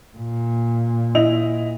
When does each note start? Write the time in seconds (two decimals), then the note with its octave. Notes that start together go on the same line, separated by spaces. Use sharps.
0.17 A#2
1.15 E4 D#5 F7